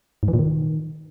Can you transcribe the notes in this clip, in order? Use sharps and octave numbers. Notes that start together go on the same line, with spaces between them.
G#2
E3
A#2
D#3